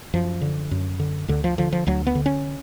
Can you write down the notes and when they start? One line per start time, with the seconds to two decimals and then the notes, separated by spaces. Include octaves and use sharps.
0.14 F#2 F3
0.41 D3
0.71 F#2
1.00 D3
1.28 D2 D3
1.44 F3
1.58 D3 F3
1.73 F3
1.87 D2 F#3
2.07 B3
2.15 D3
2.26 C#4